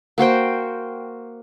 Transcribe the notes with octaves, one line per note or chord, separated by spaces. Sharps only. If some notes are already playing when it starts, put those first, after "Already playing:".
A#3 F#4 C5 G5